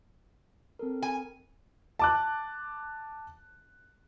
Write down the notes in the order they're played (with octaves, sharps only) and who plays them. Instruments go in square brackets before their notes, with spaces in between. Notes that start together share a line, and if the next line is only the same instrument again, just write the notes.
[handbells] C4 A4 A#4
[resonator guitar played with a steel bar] G#5
[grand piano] A5 D6 F#6